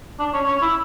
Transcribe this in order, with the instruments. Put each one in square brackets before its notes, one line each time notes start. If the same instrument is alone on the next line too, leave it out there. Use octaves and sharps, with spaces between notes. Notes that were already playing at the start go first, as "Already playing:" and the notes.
[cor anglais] D4
C#4
C#4
E4